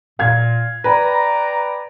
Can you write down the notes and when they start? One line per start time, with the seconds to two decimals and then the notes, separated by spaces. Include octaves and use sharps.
0.19 A#2 F5 G#6
0.84 B4 D5 G5 A#5